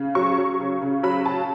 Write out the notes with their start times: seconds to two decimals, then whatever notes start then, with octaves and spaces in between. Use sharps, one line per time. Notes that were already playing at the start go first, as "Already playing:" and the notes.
Already playing: C#3
0.15 F#3 C#6
0.38 F#3
0.60 C#3
0.81 C#3
1.03 F#3 B5
1.26 C#3 A5